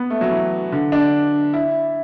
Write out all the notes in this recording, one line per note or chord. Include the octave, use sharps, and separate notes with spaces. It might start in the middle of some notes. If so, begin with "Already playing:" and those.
Already playing: B3
A3
F#3
E3
D3
D4
E4